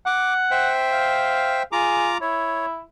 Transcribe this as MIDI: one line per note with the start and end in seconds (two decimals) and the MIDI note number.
0.06 0.71 78
0.06 0.34 86
0.51 1.63 72
0.51 1.63 76
0.51 1.63 79
0.93 1.63 77
1.72 2.18 65
1.72 2.09 68
1.72 2.18 82
1.72 2.18 86
2.21 2.80 64
2.21 2.66 73